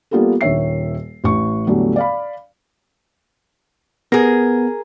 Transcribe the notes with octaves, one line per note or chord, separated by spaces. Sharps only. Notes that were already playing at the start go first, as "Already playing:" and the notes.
G3 A#3 B3 F4 G4 A4
D#1 D#3 C#5 E5 C7
A1 C#6
E2 A2 D3 F#3 G3 A3
D5 F5 B5
B3 G#4 A#4